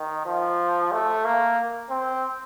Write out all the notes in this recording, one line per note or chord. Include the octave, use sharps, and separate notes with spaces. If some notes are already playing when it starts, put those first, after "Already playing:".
Already playing: D#3
F3
A3
A#3
C4